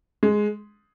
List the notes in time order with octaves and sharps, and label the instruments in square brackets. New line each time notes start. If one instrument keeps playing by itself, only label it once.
[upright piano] G#3